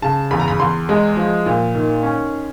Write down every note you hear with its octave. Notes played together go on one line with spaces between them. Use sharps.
C#3 A5
E2 B5
A#5
B5
E2 C6
G#3
F3
A#2
D#3
C#4